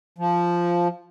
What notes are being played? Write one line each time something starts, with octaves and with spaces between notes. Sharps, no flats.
F3